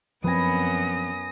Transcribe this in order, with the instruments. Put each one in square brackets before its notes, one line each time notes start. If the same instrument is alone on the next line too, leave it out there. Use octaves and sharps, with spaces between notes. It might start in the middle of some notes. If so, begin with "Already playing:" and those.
[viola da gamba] F#2 B3 [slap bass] F3 C4 [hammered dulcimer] B4 G#5 [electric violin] D#6 A#6